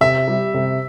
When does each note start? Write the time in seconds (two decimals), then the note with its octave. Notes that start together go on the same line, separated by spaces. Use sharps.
0.01 C3 E5
0.28 G3
0.54 C3